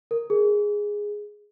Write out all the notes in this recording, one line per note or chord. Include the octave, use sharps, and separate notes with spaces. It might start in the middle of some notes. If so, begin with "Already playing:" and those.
A#4
G#4